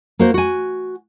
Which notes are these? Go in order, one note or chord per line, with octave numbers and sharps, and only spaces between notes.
A#3 F#4 C5
F#4 G#5